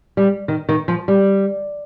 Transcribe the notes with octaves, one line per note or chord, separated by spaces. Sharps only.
G3
D#3
D#3
F3
G3